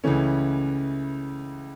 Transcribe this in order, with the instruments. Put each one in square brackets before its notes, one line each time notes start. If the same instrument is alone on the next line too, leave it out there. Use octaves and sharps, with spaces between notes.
[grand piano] C#2 C#3 E3 A3 C#4